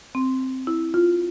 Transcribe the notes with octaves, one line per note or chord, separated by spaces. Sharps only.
C4
E4
F4